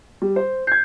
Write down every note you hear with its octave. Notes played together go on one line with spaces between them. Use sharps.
G3
C5
G6 G#6 C7